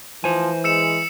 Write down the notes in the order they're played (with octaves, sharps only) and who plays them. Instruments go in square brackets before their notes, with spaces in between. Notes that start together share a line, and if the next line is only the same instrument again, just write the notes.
[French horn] E3 [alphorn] F3 [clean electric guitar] C5 G#5
[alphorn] G#3 [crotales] E6 C#7 E7